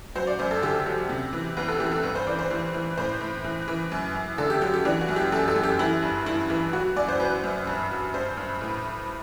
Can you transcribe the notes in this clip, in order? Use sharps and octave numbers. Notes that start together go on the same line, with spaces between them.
F#3 C5
D5
F#2 C5
A4
D3 G4
F#3
C3
E3
E2 B4
A4
E3 G4
A4
G2 B4
C5
E3 D5
C5
E3
E3
A2 C5
A2
E3
E3
F#2
F#2
D3 A4
G4
F#3 G4
G4
E3 D4
F#4
F#2
G4
F#2 A4
A4
F#2
G4
E3 E4
G2
G2 E4
E3
F#3 F#4
F#2 D5
C5
F#3 B4
F#2
G2
F#3
G2 C5
G2
A2